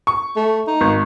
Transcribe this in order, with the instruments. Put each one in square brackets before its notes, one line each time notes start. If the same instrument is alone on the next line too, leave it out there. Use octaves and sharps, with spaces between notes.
[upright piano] C#6
[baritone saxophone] A3
D#4
[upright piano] G#1